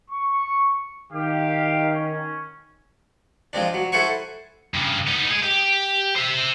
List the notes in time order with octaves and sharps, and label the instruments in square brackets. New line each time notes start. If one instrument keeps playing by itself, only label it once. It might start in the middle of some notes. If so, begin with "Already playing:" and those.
[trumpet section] C#6
[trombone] D#3 [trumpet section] G4 F5
[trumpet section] C#4
[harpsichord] F3 G#3 C4 D4
F#3
E4 A4 C5 F#5 G#5 C#6
[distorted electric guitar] G2 C#3
B3 D#4
G#4 D#5
G4
C5 E5